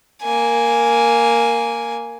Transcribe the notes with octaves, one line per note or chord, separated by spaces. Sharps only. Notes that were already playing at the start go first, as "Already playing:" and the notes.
A#3 G#5